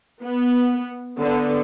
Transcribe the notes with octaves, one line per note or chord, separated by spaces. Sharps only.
B3
D3 B3